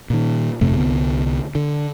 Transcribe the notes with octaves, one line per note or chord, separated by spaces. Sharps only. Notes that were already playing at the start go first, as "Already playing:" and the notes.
A#2 D#3
G1 F2 C3 A3
C2 D3 B3
D3